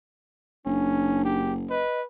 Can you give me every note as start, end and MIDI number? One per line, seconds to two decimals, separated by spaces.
0.66 1.84 30
0.66 1.24 61
0.66 1.39 62
1.25 1.53 67
1.70 2.05 71
1.70 2.00 75